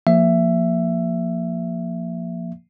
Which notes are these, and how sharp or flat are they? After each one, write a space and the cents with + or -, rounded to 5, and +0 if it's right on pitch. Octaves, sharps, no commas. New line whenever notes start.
F3 +0 A#3 +0 E5 +15